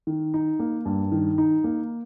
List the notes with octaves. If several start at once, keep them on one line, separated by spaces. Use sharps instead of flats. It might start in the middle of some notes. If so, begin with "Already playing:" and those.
D#3
D#4
A#3
G2
D#3
D#4
A#3